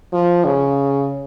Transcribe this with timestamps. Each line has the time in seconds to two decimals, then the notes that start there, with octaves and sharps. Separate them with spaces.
0.13 F3
0.45 C#3